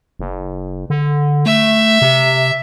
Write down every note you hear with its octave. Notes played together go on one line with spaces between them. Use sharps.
F#1
D3
A3 E5
C3